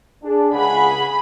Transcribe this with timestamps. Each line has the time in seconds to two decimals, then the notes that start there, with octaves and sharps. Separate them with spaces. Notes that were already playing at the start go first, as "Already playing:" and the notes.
0.24 D4 G#4
0.53 C#2 C#3 G#4 F#5 B5